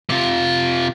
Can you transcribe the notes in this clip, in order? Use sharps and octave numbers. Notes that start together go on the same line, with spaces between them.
C3 F4